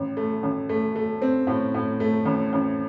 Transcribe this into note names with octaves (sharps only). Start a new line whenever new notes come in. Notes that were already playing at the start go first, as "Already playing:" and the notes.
Already playing: A1
A3
A1
A3
A3
C4
A2
A2
A3
A1
A1